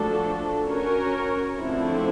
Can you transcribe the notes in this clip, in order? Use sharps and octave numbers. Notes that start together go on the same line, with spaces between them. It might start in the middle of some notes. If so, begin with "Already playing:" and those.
Already playing: F3 A3 D4 F#4 A4
C#4 F#4 A#4 C#5
D3 F3 A3 C4 E4